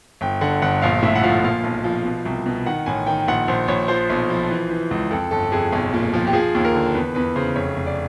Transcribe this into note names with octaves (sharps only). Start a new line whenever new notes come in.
G1 G5
D3 F#5
G1 F#5
A#1 F5
A2 E5
F#5
F3 F5
A#2 F5
B1
F3
B2
C2
B2
D#3 F#5
A1 G#5
D#3 G5
A#1 F#5
A#1 C5
A#1 C#5
F3 C5
B1
F3
E3
E3
C#2
F2 A4
G1 A4
F2 G#4
B1
A#2
F3
G4
F3 G#4
D#2
A#4
D3
E2 B4
E2 B4
C#3 C5
F1 C#5
F1
D5